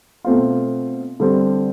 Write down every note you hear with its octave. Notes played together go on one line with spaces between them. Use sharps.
B2 A3 C4 F4
D3 G3 C4